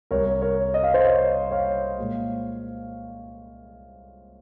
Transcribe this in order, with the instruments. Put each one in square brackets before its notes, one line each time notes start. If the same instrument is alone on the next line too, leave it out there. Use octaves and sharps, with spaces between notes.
[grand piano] C2 C3 G3 A#4 C#5
A#4 C#5
D#5
F5
C5 D#5
C#5 F5
C#5 F5
A#2 G#3